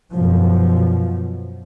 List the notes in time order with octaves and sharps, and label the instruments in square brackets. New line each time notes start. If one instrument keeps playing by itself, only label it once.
[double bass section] F#2 B2 F3